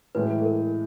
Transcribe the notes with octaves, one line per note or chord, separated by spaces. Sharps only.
A2 E3 G#3 B4
A4
A#4